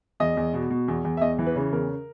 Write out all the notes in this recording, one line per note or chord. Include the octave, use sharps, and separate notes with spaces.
E2 D#5
E2
B2
B2
E2
E2
E5
E2 D#5
E3
B4
C#3
E2 A#4